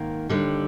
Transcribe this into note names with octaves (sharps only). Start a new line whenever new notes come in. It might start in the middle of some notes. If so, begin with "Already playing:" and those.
Already playing: G#2 D#3 A#3
D#2 D3 G3